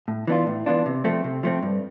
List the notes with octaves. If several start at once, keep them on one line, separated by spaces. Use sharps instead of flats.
A2
E3 B3 D4 F4
A2
E3 B3 D4 F4
C3
F3 A3 C4
C3
F3 A3 C4
G2